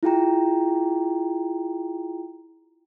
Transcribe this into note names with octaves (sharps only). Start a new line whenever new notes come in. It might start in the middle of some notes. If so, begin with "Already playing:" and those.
E4 F4 G#4 G5 A#5